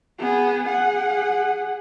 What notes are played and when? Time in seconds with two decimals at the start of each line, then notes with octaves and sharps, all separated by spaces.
0.19 B3 G#4
0.68 G#4 F#5